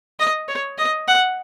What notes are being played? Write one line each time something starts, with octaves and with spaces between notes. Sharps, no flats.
D#5
C#5
D#5
F#5